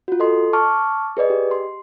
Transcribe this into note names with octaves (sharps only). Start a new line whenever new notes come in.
F4 F#4
A4 D#5 C6
A5 C#6 D6 F6
G#4 B4 D5 D#5
G4
C6